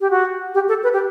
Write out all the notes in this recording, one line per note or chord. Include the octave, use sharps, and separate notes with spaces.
G4
F#4
G4
A4
B4
G4